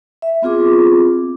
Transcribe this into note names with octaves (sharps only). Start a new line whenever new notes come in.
E5
B3 C4 F4 G#4 D6